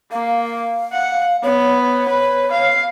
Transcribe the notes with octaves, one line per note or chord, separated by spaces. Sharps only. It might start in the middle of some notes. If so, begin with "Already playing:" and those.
A#3 F5
F#5
B3 C#5
B4
F5